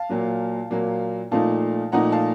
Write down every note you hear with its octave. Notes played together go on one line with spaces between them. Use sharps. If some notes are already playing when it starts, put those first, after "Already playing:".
Already playing: F5 A5
A#2 F#3 A#3
A#2 F#3 A#3
A#2 F3 A3 D#4 F5 A5
A#2 F3 A3 D#4 F#5 A#5
F5 A5